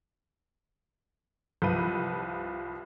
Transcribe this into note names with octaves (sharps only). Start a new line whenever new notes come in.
C2 F3 F4 B4 D#7